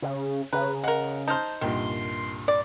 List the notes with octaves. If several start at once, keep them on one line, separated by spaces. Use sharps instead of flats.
C#3
C#3 B4 A#5
G#3 A#4 F#5
D#4 C5 A5 F6
C2 G2 A#2 D#3 C6
D5